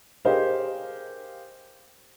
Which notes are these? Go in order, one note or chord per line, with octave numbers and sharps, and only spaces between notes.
G4 G#4 A#4 C5 D#5 F5